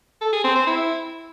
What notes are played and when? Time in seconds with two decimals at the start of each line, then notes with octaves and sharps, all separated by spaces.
0.21 A4
0.33 G#4
0.44 C4
0.55 C5
0.67 E4